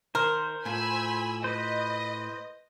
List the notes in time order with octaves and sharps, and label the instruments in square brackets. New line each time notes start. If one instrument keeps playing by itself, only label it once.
[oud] D#3 [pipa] A#4 [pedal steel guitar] C5
[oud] A2 A3 F4 [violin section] G#5 B5 E6
[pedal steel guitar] B4 C5 [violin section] D#5